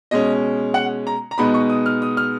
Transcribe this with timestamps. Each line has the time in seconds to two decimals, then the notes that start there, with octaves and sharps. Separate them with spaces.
0.11 B2 G#3 C#4 D#5
0.74 F#5
1.07 A#5
1.31 A#5
1.38 B2 G#3 B3 D#4 B5
1.54 C#6
1.70 D#6
1.86 F6
2.02 D#6
2.17 F6